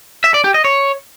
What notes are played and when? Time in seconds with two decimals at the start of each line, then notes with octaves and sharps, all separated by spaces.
0.24 E5
0.34 D5
0.44 G4
0.54 D#5
0.65 C#5